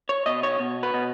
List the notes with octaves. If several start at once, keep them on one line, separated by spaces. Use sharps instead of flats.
C#5
B2 D#5
C#5
B2
B4
B2